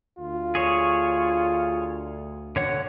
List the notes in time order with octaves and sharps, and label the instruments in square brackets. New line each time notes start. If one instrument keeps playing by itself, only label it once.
[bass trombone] D2 [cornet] F4
[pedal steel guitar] G#4 C#5
D3 C#5 F#5